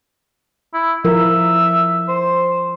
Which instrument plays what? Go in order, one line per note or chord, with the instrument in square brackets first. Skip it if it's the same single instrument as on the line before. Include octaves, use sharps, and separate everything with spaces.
[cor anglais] E4
[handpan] F3 E4 A#4 [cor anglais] E5
[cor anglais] C5